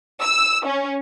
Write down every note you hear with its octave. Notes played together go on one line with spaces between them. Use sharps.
E6
C#4